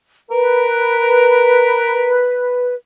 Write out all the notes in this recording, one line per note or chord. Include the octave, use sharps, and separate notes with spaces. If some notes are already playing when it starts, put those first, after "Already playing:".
A#4 B4